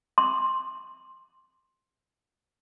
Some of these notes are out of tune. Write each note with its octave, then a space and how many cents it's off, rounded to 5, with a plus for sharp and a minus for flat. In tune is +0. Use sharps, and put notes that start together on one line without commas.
C6 +10